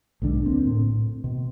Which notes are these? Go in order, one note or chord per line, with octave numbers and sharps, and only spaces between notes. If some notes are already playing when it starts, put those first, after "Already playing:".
B1 G#2 D3 D4
D2 A#3 C4
A2
B2